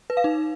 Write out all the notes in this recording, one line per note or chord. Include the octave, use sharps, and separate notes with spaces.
B4
F5
D#4